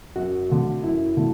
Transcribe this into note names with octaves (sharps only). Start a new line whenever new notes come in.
F#2 F#4
D3 A3
F#2 E4
D3 A3